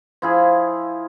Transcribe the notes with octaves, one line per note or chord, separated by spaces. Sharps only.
F3 E4 G#4